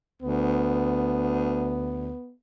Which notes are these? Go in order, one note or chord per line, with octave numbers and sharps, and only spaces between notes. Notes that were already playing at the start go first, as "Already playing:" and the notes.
D2 B3